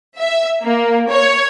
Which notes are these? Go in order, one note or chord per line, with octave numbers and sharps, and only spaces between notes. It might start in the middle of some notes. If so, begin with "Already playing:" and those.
E5
A#3
C#5